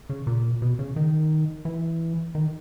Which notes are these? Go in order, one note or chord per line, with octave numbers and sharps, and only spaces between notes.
C#3
A#2
B2
C#3
D#3
E3
D#3